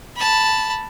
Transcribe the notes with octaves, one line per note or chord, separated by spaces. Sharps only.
A5 B5